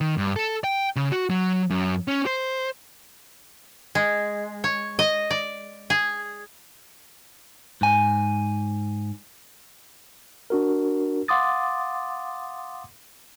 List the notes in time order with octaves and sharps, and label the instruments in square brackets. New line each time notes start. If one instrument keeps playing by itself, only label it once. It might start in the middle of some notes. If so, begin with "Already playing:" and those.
[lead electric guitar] D#3
G2
A4
G5
C#3
F#4
F#3
F#2
C#4
C5
[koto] G#3
C#5
D#5
D5
G#4
[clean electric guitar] G#2 G#5
[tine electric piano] D4 F#4 A#4
F5 F#5 C6 D6 D#6 A6